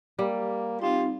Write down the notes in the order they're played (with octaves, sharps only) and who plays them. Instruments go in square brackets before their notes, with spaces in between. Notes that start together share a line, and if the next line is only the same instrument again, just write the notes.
[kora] G3 [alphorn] A#3
[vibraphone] C4 D#4 [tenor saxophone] F4 [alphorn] G4